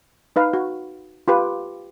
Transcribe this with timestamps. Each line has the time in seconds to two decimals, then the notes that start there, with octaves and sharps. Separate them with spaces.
0.36 D#4 B4 F5
0.53 F#4
1.28 F4 G4 B4